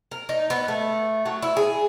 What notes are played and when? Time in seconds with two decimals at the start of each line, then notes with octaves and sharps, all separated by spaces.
0.11 A#4
0.29 D#4
0.50 B3
0.68 A3
1.26 F#3
1.42 E4
1.57 G#4